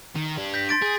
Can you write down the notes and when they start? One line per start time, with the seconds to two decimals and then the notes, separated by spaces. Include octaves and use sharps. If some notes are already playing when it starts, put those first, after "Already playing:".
0.16 D#3
0.38 D4 G4
0.54 G6 A#6 B6
0.69 C6 A6 D7
0.82 G#4